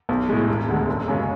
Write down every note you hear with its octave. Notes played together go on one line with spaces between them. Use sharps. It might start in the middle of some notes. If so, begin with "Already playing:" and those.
B1
A2 G#3
E1
D2 D3 G#3
F#1
F#2 C#3 G#3 C#4